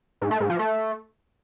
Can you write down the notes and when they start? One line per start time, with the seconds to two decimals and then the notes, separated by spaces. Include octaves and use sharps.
0.21 G#2
0.31 A3
0.40 G#2
0.50 F3
0.59 A3